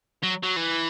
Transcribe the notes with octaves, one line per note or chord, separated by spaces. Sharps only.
F#3
F#3
E3